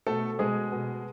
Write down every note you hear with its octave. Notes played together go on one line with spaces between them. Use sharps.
B2 A3 A4
B2 G#3 G#4
B2